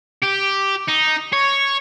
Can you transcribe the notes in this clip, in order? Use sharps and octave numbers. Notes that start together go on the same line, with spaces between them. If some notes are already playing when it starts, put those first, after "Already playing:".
G4
D#4
C#5